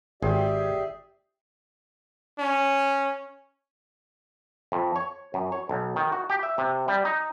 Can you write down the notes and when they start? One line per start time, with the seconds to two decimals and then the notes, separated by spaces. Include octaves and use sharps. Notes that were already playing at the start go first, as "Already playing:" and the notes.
0.22 G#1 G4 G#4 C5 D5 E5 G5
2.39 C#4
4.72 F2
4.96 C#5
5.34 F#2
5.52 C#5
5.69 B1
5.96 D#3
6.12 F#4
6.30 G4
6.43 E5
6.58 C3
6.88 G3
7.05 D#4